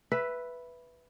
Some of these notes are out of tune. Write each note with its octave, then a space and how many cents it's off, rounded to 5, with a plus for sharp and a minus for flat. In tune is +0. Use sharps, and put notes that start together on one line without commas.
B4 +0 E5 +10